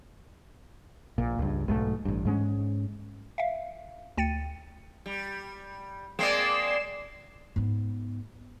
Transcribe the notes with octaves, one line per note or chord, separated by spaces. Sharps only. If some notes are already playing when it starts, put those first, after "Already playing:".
A#1 A#2
C#2 G2
B1 G#2 D3 A3
A1 G2
G#2 G#3 B3 C#4
E5 F5
D2 G5 A6 C#7 D#7
G3
G#3 A#3 C4 D5 C7 E7
G#2 B3